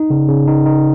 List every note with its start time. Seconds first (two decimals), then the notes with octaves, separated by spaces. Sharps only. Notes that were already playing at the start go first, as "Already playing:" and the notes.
Already playing: D#4
0.10 C#3
0.29 C#3
0.47 D#4
0.66 D#4